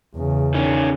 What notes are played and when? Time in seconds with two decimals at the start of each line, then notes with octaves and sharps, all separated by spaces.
0.15 E2 C#3
0.55 D#3 C#4